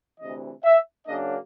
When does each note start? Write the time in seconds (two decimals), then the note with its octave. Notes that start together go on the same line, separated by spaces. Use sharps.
0.20 D2 C3 E3 D#5
0.64 E5
1.07 F#2 C#3 F#3 A#3 D4 D#5